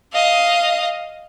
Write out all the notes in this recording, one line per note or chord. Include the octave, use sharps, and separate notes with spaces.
D#5 F5